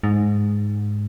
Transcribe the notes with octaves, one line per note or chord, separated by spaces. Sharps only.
G#2